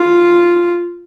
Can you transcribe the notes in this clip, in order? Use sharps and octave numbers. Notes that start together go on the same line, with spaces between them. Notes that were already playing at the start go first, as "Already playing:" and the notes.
Already playing: F4